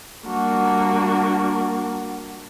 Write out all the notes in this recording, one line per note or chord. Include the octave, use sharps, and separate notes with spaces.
G3 A#3 D4 F#4